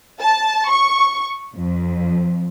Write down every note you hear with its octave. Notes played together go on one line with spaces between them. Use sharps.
A5
C#6
F2